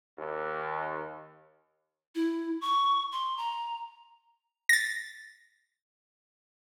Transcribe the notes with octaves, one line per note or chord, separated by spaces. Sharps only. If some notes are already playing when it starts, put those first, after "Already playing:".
D#2
E4
C#6
C6
A#5
A6 A#6